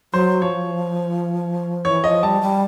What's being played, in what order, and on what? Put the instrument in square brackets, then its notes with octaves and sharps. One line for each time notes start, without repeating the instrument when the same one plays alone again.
[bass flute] F#3 [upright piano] C5
[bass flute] F3 [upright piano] C#5
[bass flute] E3 [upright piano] C#5
[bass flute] F3 [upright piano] D#5
[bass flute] G3 [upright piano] A5
[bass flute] G3